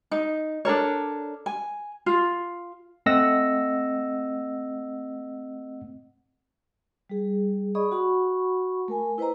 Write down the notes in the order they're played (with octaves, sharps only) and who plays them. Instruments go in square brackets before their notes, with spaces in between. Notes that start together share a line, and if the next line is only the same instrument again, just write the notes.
[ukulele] D#4
D4 A4 A#4 C#5
G#5
F4
[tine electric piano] A3 C4 D#5 F#5 E6 A#6
[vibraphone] G3 G#4
G#4 D5 D#5 B5 C#6 D#6
F#4 F#5 B5 C#6
A3 A#4 G#5
E4 B4 C5 D#5 A#5